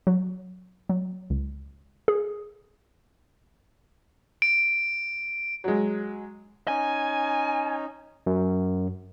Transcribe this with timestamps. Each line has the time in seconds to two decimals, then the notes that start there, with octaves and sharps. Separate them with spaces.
0.07 F#3
0.89 F#3
1.30 C#2
2.08 G#4
4.42 D7
5.64 F#3 G#3
6.68 C#4 D#4 G#5
8.26 F#2